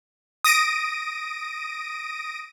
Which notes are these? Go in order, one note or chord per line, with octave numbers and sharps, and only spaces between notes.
D#6 A#6 D7 D#7